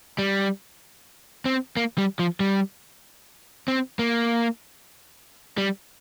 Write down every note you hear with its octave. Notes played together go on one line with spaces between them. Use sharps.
G3
C4
A#3
G3
F3
G3
C4
A#3
G3